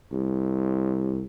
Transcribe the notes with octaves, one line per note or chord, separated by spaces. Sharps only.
C2